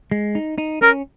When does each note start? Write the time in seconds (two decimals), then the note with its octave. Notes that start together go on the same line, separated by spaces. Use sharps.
0.11 G#3
0.35 D#4
0.58 D#4
0.82 C#4 A#4